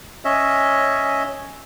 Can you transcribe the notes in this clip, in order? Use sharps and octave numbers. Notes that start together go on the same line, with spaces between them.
C#4 C#5 D#5 E5